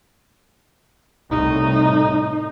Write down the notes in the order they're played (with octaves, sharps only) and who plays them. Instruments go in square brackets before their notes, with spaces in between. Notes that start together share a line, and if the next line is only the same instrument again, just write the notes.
[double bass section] C2 A2 [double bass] D#4